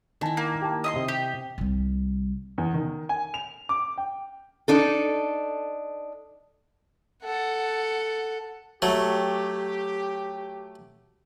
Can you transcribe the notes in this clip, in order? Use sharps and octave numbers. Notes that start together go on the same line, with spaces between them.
D#3 E4 G#5 A5
A#3
G4 A5
D#5 E5 C6
C3
G4 D6
C2 G3
E2
D#3
G#5
F7
D6
G5
D4 D#4 A4
A4 F#5
F#3 A3 G4